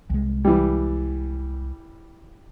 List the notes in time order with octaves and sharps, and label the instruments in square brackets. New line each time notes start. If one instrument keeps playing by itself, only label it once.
[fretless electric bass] C2 G#3
[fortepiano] E3 G3